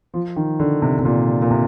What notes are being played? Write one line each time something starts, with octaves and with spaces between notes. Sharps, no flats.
F3
D#3
D3
C3
C3
A#2
A#2
C3